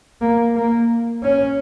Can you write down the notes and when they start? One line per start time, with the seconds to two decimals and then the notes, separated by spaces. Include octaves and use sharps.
0.21 A#3
0.55 A#3
1.22 C#4